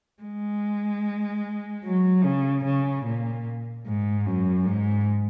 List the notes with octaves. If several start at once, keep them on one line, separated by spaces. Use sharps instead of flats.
G#3
F#3
C#3
C#3
A#2
G#2
F#2
G#2